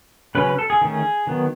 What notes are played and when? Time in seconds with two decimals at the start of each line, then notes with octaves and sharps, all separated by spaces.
0.35 C#3 F#3 C#4 B4
0.46 B4
0.59 A4
0.70 G#4
0.81 D#3 A3 C#4
1.27 D#3 F#3 B3